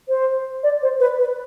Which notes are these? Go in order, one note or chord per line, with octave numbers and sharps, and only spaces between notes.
C5
D5
C5
B4
B4